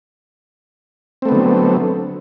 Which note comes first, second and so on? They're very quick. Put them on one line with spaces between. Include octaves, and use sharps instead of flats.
C4 A3 B3 D3 F#3